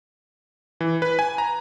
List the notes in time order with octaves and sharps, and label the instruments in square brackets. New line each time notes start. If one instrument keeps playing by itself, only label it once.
[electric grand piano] E3
B4
G#5
A#5